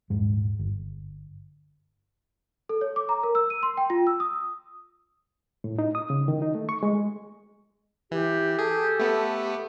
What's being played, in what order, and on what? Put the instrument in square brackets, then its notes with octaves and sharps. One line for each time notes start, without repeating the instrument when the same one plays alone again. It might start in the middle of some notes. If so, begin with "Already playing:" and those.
[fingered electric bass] D#1 G#2 G#3
G1
[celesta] A4
C#5
D6
A#5
A#4
E6
D#7
C6
G5
F4
E6
D#6
[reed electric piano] A2
D#4
D#6
C#3
D#3
D#4
A3
C#6
G#3
[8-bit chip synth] E3 [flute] G4
[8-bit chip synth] G#4 [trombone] A4
[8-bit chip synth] A3 B3